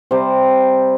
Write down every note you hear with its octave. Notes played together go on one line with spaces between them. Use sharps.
C3 G3 C5